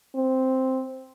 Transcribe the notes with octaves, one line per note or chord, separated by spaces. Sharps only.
C4